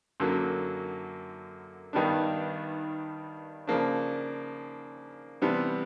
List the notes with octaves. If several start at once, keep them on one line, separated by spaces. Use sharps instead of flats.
F#2 D3 F#3 A#3
G2 D#3 G3 B3 D4
C#3 F3 A#3 D4
C3 E3 G3 B3 D4